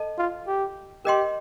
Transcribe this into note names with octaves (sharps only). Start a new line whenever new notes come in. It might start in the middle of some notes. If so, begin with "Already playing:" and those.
Already playing: A4 D#5 A5
F4
G4
G4 A#4 D#5 G5 C6